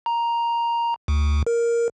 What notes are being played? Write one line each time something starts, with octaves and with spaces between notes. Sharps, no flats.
A#5
D2
A#4